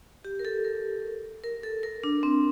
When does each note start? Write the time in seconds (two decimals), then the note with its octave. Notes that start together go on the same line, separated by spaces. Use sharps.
0.25 G4
0.39 A#4
0.45 A4
0.65 A#4
1.44 A#4
1.63 A4
1.83 A#4
2.04 D4
2.23 C4